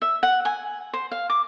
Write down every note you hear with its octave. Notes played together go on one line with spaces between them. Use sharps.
E5
F#5
G#5
C5
F5
D6